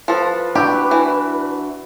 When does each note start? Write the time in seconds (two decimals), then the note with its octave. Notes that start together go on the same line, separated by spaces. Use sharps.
0.08 F3 A4 B4
0.55 D4 E4 F#4 G4
0.91 E3